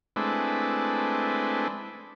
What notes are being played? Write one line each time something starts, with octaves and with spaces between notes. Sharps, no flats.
G#3 A3 C4 D4 E4 B4